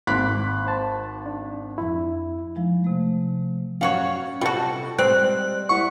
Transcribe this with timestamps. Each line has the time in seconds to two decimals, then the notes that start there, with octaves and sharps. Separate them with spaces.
0.07 G#1 B5 C6 D6 F#6 B6
0.67 C5 A5
1.26 D4
1.78 F2 E4
2.55 F3 G#3 D#4
2.84 C3 A3
3.81 F#2 G3 C#4 F#4 C#5 F5
4.41 C3 G3 F4 F#4 A4 A5
4.99 G3 G#3 C4 C5 G#5 F#6
5.69 G3 E4 F#5 C#6